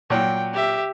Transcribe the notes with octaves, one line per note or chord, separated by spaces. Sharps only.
A#2 F#3 G5
G4 E5